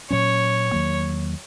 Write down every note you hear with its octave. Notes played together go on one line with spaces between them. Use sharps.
A#2 F#3 C#4 C#5
E2 D#3 F#3 A#3